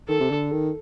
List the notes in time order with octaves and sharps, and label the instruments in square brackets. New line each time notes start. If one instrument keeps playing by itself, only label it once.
[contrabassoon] D#3 [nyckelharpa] A4
[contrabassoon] C3
D3
D#3